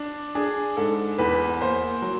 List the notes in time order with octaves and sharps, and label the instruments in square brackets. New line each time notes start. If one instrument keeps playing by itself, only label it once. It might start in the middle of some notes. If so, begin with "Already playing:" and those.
Already playing: [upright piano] D4
D4 G#4
G#2 A4
E2 B4
A#3 C5
F#3